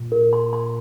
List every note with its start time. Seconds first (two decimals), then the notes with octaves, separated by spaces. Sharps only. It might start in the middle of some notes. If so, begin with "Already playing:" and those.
Already playing: A#2
0.12 A#4
0.33 C6
0.53 C6